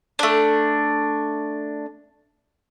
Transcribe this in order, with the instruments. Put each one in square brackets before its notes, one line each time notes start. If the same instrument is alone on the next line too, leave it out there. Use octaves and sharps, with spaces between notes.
[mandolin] A3 D4